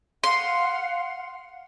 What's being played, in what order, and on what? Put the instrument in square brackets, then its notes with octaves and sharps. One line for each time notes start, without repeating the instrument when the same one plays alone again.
[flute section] F5 F#5 [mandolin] C6